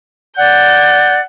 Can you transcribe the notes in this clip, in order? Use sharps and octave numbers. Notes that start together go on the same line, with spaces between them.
D5 F#5 G6